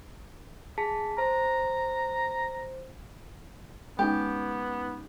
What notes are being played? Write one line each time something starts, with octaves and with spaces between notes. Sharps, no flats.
G#4 A5 B6
C5 A#5
G#3 B3 C#4 D#4 G4